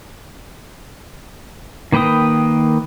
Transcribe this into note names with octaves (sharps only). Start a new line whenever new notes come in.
D#3 A#3 B4 G5 D#6